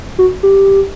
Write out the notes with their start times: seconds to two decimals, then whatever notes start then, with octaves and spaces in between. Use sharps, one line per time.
0.18 F#4
0.43 G4